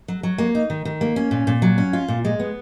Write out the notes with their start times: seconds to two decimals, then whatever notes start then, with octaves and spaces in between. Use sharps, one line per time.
0.08 F#3
0.23 F#3
0.38 A#3
0.55 D#4
0.70 D#3
0.85 D#3
1.01 A#3
1.16 C#4
1.31 A#2
1.47 A#2
1.62 F#3
1.78 C#4
1.93 F4
2.08 A#2
2.25 G#3
2.40 B3